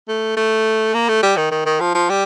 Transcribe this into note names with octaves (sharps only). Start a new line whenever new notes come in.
A3
A3
A#3
A3
G3
D#3
D#3
D#3
F3
F3
G3